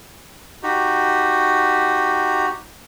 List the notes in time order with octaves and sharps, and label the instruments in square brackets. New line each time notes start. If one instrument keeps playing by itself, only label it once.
[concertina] D#4 F#4 G4